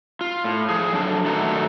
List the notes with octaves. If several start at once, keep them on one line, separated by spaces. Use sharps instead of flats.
F4
A2
F3 G#4
F#3 D4 A4
G2 D#3 A3 F#4 A4 A#5